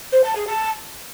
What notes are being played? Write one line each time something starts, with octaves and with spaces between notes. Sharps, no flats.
C5
A5
G#4
A5